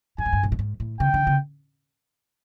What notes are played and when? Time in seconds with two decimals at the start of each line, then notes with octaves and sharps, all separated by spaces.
0.18 G2 G#5
0.26 G#2
0.33 G2
0.43 A#2
0.52 A2
0.59 G#2
0.80 A2
1.00 C#3 G5
1.14 D3
1.27 C#3